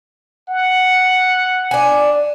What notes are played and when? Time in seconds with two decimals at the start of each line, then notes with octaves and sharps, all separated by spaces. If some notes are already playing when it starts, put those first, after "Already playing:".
0.49 F#5
1.71 D4 G#5